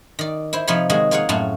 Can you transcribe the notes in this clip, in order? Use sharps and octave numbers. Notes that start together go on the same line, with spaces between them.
D#3 D5
E4 C5
C3 F3 D#4 F4 C#5 B5
D#3 G#3 F#4 G#4
A#3 F4 G#4 C#5 F#5
F#2 A2 A3 F4 F#4